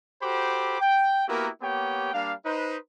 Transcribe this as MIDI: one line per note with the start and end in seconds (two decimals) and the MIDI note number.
0.23 0.80 66
0.23 0.80 67
0.23 0.80 69
0.23 0.80 72
0.23 0.80 83
0.23 0.80 86
0.81 1.25 79
1.28 1.49 58
1.28 1.49 59
1.28 1.49 64
1.28 1.49 66
1.28 1.49 67
1.28 1.49 70
1.62 2.11 58
1.62 2.11 59
1.62 2.11 67
1.62 2.11 73
1.62 2.11 79
2.14 2.34 55
2.14 2.34 58
2.14 2.34 62
2.14 2.34 77
2.45 2.77 63
2.45 2.77 71
2.45 2.77 72